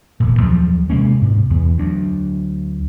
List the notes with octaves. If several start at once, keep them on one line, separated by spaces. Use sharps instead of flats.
E1 D2 A#2
D#2 F3 F#3
C3 G#3 A#3 C#4
G#2 C3
E2 B3
D2 F#3 D4